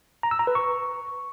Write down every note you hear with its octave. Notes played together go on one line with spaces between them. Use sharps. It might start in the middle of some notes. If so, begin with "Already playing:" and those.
A#5
E6
A#5
B4
C#6